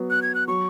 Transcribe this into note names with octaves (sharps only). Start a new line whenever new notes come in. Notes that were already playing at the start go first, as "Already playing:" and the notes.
Already playing: F#3 B3
F#6
G#6
F#6
F#3 C#6